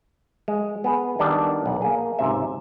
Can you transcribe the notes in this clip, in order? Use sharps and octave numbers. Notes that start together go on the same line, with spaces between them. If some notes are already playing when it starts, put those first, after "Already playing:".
G#3
B3 G#4 B4
D#3 G3 B3 D4 A4 D5
B1 F#5
A#3 G#4
C#2 G#2 C3 E5